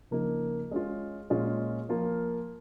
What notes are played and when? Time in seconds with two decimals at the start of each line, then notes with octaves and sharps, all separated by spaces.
0.11 C#3 F3 A#3 D#4
0.71 G#3 C#4 F4
1.30 A#2 G#3 C#4 F4
1.89 F3 A#3 F4